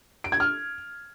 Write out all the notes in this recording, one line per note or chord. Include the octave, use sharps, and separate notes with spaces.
D7
G#6
F6